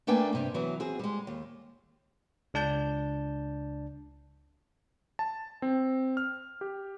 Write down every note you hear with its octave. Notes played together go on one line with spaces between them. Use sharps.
A3 A#3 D4 B4 G5 G#5
G2 C3
E3 F#3 B3
C4 F#4 G#4
G3 G#3
D#2
C#2 D4 A5 G6
A5
C4
F6
G4